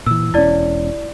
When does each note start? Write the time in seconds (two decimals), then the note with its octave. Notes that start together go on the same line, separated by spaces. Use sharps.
0.06 A#2 E3 E6
0.34 E1 C#4 E4 D5